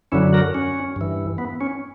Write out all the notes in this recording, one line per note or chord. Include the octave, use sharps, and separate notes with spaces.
F#2 D3 F#3 C#4 E4
F#4 A#4
C#4
G2 E3
B3
C#4